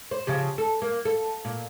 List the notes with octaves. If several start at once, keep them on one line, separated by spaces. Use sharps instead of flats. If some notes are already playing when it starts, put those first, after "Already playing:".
C5
C#3 F3 G4
A4
A#3
A4
A#2